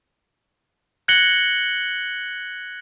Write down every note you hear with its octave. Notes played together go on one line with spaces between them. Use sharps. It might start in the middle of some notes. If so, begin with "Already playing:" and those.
F#6 G#6 A#6 C#7 F#7 G7